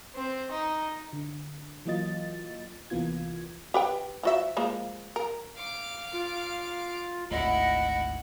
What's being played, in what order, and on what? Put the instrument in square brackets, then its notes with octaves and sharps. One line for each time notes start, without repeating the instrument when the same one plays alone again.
[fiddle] C4
D#4
[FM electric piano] D3
E3 F#3 A#3 F4 D#5 A6
C2 E3 A#3 B3 F4 G#6
[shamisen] G4 B4 G5
F3 F#4 E5
F3 G#3 A#3
A#4
[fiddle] F5 D6
[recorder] F4
[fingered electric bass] G#1 D2 [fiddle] E4 F#5 [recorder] D#5